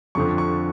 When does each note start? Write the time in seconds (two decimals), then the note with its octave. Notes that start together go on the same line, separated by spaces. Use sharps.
0.15 F2 D3 F3 C#6
0.38 C#6